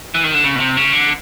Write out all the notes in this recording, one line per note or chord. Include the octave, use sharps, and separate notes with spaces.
E3
D#3
D3
C#3
B2
C3
C#3
D3